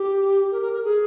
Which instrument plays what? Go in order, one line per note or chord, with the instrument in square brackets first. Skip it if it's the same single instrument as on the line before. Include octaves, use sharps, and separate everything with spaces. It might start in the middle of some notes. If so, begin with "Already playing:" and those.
Already playing: [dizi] G4
A#4
A#4
A#4
G#4